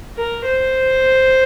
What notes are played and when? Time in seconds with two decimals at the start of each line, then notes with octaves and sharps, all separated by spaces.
0.17 A#4
0.46 C5